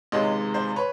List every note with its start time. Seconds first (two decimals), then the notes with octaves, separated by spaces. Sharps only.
0.12 C#2 C3 D#3 G#3 C#5 D#5
0.54 C5 D5
0.76 B4 C#5